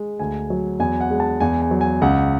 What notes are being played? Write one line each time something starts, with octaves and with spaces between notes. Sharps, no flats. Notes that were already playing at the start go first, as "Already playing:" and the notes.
Already playing: G#3
D2 G#5
F#3
E2 G#5
F#5
G#3
A5
E2 G#5
G#5
F#3
G#5
C#2 F#5